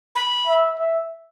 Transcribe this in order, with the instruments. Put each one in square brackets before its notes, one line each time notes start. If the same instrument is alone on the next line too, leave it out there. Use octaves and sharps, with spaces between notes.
[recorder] B5
[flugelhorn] E5
E5